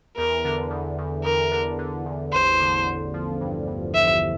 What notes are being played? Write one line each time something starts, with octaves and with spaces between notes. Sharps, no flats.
E2 A#4
D3
E2
E2
E2 A#4
D3
D3
E2
A1 C5
D3
A1
F3
G2
G2
A1 E5